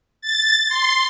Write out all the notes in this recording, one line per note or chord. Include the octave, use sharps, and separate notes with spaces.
A6
C6